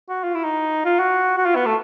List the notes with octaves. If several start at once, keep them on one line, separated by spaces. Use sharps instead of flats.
F#4
F4
E4
D#4
F4
F#4
F#4
F4
B3
A3